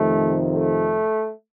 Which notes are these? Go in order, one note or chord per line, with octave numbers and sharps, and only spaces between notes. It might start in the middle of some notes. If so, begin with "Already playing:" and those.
Already playing: F2 C3 D#3 A3
A3